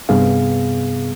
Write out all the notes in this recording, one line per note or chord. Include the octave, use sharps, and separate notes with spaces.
G2 C3 B3 G#4 F5